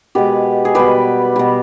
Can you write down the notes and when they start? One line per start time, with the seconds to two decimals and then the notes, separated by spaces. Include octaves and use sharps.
0.15 B2 G#3 G4 B4
0.65 G#4
0.75 B2 G3 G4 B4
1.36 B2 G3